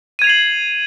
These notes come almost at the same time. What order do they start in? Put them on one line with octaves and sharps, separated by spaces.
D#7 G#6 F7 C7 F#7